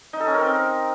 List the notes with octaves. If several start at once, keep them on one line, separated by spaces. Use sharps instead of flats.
D#4
A4
C#4
A#4
C4